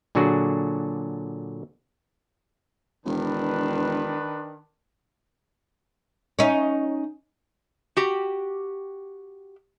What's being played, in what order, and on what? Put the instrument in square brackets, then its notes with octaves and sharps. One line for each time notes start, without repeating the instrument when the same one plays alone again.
[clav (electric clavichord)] A#2 D3 F#3 D4 F#4 G#4
[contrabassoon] E1 [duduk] D#3 [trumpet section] D4 B4
[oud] C#4 D#4
[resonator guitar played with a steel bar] F#4 G4